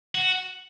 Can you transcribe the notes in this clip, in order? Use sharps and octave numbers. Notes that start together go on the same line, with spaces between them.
F#4